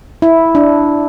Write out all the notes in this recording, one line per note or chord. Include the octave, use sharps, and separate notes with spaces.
E4
D4